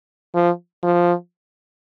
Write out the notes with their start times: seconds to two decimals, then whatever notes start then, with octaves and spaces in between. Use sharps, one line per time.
0.35 F3
0.83 F3